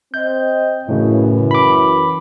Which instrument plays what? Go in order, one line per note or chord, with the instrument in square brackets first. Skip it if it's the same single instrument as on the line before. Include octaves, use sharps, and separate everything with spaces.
[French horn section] C4 D#5 [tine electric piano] G6
[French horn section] F#2 E3 [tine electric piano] A2 C#3
[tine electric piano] B5 D6